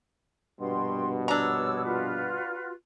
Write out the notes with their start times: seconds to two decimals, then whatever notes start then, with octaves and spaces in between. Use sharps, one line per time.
0.61 A#1 G2 B2 G5 C6
1.28 D4 C#5 A#5 E6
1.84 F4 F#4 B4